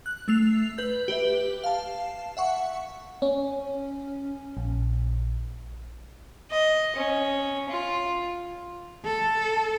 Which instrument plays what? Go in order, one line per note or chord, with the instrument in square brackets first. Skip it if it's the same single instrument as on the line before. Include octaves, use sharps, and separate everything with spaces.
[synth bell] F#6
A3 E6 C7 F7
B4 G6
G4 B4 E5
F5 A5
E5 F#5 C#6
[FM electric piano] C#4
A#1
[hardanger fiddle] D#5
C#4
F4
[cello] A4